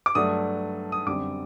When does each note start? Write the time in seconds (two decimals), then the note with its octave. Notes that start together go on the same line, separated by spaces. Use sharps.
0.06 D6
0.15 G2 F#3 A3 D4 D#6
0.92 D#6
1.06 F#2 D3 G3 C4 D6